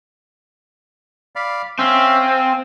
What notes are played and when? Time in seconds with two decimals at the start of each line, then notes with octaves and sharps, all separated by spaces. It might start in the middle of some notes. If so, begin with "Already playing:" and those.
1.36 D5 F5 B5
1.79 C4 C#4 E5 F5
2.20 F5 G#5